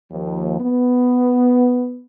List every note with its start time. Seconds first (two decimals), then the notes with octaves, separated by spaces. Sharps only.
0.12 D#2 F3
0.60 B3